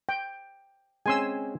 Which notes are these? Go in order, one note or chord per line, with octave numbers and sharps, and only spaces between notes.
G5
G#3 C4 C#4 G#5 C6 E6